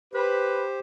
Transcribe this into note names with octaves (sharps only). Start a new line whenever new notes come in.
G4 B4 C5